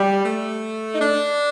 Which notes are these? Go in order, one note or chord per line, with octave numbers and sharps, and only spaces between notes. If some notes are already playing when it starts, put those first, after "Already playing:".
Already playing: G3
A3
D#4
D4